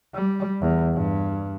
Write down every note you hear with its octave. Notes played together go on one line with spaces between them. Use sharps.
G3
E2
G2